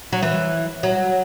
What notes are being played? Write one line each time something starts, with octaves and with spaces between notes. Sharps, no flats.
F#3
E3
F#3